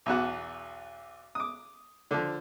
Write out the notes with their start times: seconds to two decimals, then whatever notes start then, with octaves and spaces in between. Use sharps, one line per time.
0.06 B1 E2 F#4
1.35 D6 D#6
2.11 D3 F3